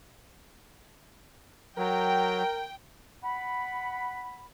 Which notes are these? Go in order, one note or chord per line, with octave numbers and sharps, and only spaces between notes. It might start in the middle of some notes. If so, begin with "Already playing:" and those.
F#3 A#4 G5
F#5 B5